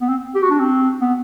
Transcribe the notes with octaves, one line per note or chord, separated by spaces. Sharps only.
B3
C4
G4
F#4
D4
C4
B3